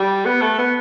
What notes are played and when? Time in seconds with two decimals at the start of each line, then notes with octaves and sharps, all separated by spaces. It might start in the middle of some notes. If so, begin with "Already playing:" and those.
Already playing: G3
0.26 B3
0.41 A3
0.58 B3